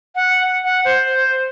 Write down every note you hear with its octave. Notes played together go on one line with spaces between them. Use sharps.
F#5
F#5
C5